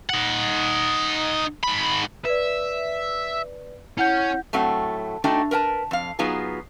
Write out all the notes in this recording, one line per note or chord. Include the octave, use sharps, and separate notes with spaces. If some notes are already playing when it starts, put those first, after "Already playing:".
D#4 F#5
G#2 B5
B4 D5 E5
C#4 E4 F#5 G6
A2 F#3 A3 C4 F#5
A3 D4 D#4 F#4 G5
A#4 B4 G5 A5
F2 F5
F#3 B3 D#4 F4 G#4